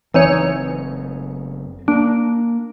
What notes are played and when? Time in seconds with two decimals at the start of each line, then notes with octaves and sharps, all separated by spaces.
0.14 F#1 E3 C4 D#4 C#5
1.88 A#3 D4